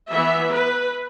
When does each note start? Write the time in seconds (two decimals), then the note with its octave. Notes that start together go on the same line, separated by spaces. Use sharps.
0.11 E3 B3 E5
0.50 B4